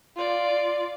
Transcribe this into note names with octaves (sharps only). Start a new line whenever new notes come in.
F4 D5